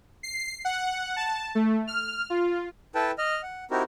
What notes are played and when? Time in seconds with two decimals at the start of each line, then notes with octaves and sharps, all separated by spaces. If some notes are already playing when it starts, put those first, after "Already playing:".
0.23 C7
0.65 F#5
1.16 A5
1.55 A3
1.87 F6
2.30 F4
2.95 E4 A4 B4 G5 A5
3.18 D#5 F6
3.43 F#5
3.71 C4 D#4 E4 F#4 G4 A#4